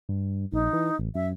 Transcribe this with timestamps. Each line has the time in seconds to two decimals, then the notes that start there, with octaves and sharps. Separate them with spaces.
0.09 G2
0.53 A#1 D#4
0.73 E3
0.99 A1
1.15 F#2 E5